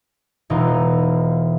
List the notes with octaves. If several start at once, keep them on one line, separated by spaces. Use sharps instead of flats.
E1 E3 D#4 F4